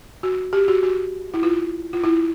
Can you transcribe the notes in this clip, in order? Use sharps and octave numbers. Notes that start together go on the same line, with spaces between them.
F#4
G4
F#4
F#4
E4
F4
F4
E4